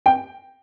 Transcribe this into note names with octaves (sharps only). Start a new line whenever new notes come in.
G5